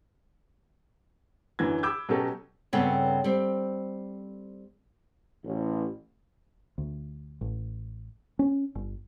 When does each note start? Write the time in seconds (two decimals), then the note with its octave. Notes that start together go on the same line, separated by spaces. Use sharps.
1.59 F#2 D3 E3 B4 G#6
1.83 B5 D6 E6 G6 G#6
2.09 B2 F#3 C#4 G4 A4
2.73 G2 C#3 B3 C4 A4 C#5
3.24 G3 C4
5.45 A1
6.78 D2
7.41 A1
8.39 C#4
8.75 G1